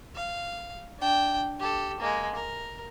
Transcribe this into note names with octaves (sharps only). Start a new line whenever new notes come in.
F5
D4 G5
G4 A4
G#3 A#3
A#4